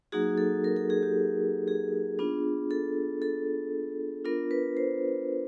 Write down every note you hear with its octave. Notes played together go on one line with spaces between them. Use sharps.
F#3 A#3 D#4 F#4 G#4
A4
A#4
A4
G#4
G4
G#4
B3 D4 F4
A4
A4
B3 D4 F4 A#4
B4
C5